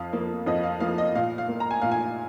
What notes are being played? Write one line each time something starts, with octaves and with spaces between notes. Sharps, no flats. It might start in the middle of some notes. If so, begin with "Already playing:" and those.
Already playing: F2 F5
F3 A#3
F2 D#5
F5
F3 A#3 F5
D#5
A#2 F5
F5
A#3
A#5
G#5
A#2 F5
G#5